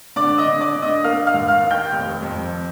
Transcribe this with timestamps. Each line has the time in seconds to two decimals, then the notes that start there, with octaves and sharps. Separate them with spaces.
0.16 D3 D5 D6
0.38 D#5 D#6
0.45 D3
0.60 D5 D6
0.75 D3
0.82 D#5 D#6
1.04 A#3 F5 F6
1.27 F5 F6
1.34 D#2
1.48 F5 F6
1.63 D#3
1.70 G5 G6
1.93 F1
2.22 F2